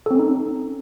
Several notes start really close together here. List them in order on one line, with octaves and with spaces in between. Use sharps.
A4 C4 C#4 D#4